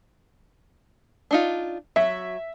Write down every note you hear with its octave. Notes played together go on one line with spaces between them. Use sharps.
D4 D#4 F4
F#3 E5